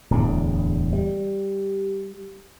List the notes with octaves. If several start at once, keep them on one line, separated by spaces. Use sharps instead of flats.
D1 E2 D3
G3